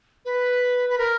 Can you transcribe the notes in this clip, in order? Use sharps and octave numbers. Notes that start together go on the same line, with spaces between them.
B4
B4
A#4